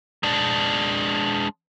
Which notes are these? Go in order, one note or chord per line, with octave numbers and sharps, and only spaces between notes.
G#3 D4